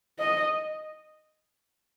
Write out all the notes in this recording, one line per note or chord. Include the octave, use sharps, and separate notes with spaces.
D#5